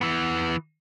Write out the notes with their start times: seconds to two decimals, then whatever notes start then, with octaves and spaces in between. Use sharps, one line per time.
0.01 E3 B3